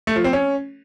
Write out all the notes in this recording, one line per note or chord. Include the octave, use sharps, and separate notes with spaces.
A3
F3
C4
C#4